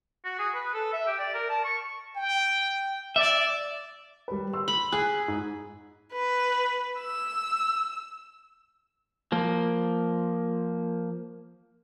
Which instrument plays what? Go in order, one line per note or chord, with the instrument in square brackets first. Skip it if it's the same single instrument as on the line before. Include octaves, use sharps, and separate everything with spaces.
[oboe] F#4
G#4
B4
A4
E5
G4
D5
A#4
A5
C#6
[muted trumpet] G5
[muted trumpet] D5 [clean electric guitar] E5
[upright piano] G3 B4
C6 E6
[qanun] B5
[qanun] G#4 [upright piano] F#6
[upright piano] G#2
[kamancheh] B4
E6
[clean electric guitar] F3 A#3